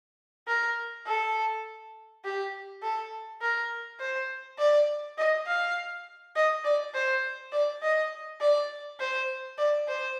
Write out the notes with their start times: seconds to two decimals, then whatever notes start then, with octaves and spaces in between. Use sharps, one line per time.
0.47 A#4
1.06 A4
2.24 G4
2.82 A4
3.42 A#4
4.00 C5
4.59 D5
5.18 D#5
5.46 F5
6.36 D#5
6.64 D5
6.94 C5
7.52 D5
7.82 D#5
8.41 D5
9.00 C5
9.58 D5
9.88 C5